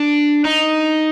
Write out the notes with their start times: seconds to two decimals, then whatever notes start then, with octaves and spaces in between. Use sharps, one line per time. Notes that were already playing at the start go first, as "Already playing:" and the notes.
Already playing: D4
0.45 D#4